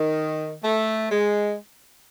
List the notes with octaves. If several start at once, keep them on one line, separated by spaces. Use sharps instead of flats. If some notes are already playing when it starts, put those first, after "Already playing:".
Already playing: D#3
A3
G#3